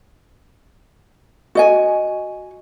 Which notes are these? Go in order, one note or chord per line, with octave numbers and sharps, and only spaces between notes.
F#4 D#5 G#5